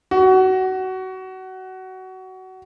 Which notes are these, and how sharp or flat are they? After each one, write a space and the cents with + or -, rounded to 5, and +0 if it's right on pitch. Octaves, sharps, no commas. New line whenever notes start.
F#4 +20